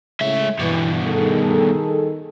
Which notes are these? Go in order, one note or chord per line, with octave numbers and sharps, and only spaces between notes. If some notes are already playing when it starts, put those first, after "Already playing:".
A2 C#3 G#3 E5
G2 B2 E3
D#3 G#4 A4